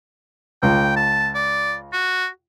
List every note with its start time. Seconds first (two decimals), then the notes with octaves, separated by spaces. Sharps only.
0.63 C#2 G5
0.96 A5
1.35 D5
1.93 F#4